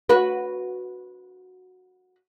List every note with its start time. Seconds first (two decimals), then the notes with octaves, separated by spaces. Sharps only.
0.09 F#4 B4